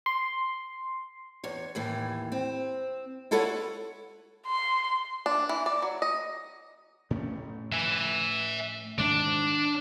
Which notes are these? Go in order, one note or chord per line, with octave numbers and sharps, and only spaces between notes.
C6
E2 C#5
D#2 A2 E3
C4
E4 F4 A4 B4 C#5 F#5
C6
D4
E3
D5
F#3
D#5
A2 A3 C#4
E5 G#5
G#2 D#3 G#3 D4 D5